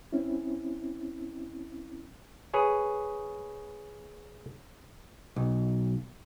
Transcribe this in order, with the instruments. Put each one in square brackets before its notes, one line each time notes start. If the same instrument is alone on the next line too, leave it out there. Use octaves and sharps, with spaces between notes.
[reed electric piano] C4 C#4 E4
[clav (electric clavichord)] G#4 B4 C#5 G#5
[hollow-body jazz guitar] B1